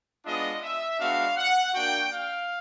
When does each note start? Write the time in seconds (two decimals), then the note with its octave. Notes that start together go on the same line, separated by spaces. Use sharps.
0.25 G#3 B3 D4 F4 D#5
0.63 E5
0.99 G#3 B3 D4 F#4 F5
1.37 F#5
1.74 A#3 D4 F#4 G5
2.11 F5